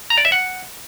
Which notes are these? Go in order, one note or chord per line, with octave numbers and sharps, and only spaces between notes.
A#5
D5
E5
F#5